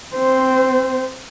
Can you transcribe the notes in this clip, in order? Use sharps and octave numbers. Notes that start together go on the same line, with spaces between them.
C4 C5